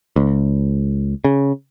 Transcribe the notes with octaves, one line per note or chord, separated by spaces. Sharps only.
C#2
C#3